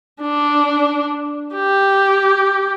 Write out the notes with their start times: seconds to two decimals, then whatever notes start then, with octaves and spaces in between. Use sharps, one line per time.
0.22 D4
1.55 G4